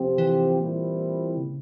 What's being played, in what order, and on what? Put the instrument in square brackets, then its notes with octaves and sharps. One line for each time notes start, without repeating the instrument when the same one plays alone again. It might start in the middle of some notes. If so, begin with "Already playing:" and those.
Already playing: [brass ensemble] F2 C3 F3 C4 G4
[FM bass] E3
[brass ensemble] A#2 G3 C4 E4
[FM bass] C#3